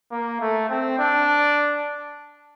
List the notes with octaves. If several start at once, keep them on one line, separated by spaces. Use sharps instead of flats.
A#3
A3
C4
D4